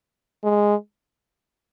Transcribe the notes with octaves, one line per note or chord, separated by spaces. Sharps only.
G#3